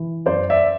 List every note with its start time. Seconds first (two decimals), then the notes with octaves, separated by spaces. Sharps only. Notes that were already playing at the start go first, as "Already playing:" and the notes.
Already playing: E3
0.26 F#2 C5 D5
0.50 D5 E5